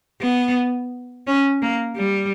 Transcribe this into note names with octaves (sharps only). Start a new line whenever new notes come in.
B3
C#4
A#3
G3